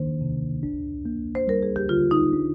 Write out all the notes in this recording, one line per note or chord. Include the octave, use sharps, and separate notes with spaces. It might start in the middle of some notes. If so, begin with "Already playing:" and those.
Already playing: D#3 A#3 D4 C5
C3
D4
A#3
C5
G3 A#4
G#4
G4
D3 F4
D#4
D4